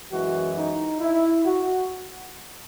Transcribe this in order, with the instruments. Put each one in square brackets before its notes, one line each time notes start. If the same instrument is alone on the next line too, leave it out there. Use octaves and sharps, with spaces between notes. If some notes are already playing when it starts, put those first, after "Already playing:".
[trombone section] F#2 E3 G#3 F#4
D#4
E4
F#4